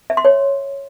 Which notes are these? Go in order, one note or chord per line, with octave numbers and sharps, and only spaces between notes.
E5
C6
C#5